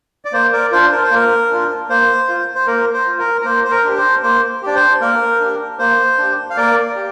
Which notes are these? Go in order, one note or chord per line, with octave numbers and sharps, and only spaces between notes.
D5
A#3 C5
A#4 D5
D4 F4 C5
A#4
C5
A#3 A#4
D4 F4
A#3 C5
F4
C5
A#3 A#4
C5
F4
A#4
A#4
A#3 C5
C5
A#4
D4 G4
C5
A#3 C5
D4 G4 D5
C5
A#3 A#4
D4 G4
A#3 C5
D4 G4
F5
A#3 A#4 D5
G4